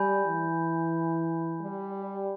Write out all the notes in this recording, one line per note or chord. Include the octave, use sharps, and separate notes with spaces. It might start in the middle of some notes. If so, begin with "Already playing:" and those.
Already playing: G3 G#5 B5 G6
E3
G3